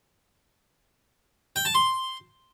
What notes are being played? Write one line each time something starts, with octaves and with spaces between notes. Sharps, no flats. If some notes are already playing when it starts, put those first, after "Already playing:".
G5
A5
C6